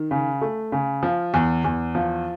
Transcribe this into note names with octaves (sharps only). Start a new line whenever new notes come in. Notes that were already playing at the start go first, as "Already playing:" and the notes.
Already playing: D#3
C#3
A3
C#3
F3
E2
E2
F3